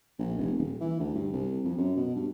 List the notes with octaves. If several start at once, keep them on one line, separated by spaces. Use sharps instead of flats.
A#1
F1
D#1
E3
D2
G2
C2
F2
F#2
B2
G2